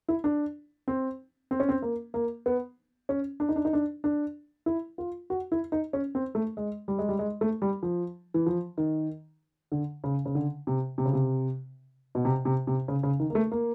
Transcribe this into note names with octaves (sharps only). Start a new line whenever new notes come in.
E4
D4
C4
C4
C#4
C4
A#3
A#3
B3
C#4
D4
D#4
D4
D#4
D4
D4
E4
F4
F#4
E4
D#4
C#4
C4
A3
G#3
G3
G#3
G3
G#3
A3
G3
F3
E3
F3
D#3
D3
C#3
C#3
D3
C3
C3
C#3
C3
B2
C3
C3
C3
C#3
C#3
D#3
A#3
A3
A#3